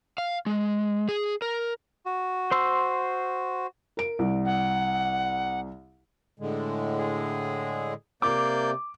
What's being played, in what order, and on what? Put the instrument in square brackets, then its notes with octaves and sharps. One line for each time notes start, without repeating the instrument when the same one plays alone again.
[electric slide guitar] F5
G#3
G#4
A#4
[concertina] F#4
[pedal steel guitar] C5 C6 E6
[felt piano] A#4 D7
C2
[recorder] F#5
[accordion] A2 D3 G#3
[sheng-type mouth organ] G#4
[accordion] C3 [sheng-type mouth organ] A#3 D5 G6 [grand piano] D6